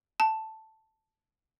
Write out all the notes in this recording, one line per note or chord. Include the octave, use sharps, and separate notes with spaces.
A5